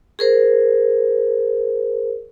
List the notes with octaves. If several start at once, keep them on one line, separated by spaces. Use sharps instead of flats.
G#4 A#4 C5